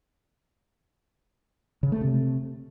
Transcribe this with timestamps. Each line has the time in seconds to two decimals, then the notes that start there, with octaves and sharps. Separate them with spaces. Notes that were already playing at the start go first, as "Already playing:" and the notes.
1.83 C#3
1.92 A3
2.01 C3